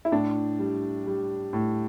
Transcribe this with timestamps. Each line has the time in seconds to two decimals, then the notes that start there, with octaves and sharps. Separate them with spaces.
0.05 E4
0.12 A2 D4
0.59 G3
1.06 G3
1.53 A2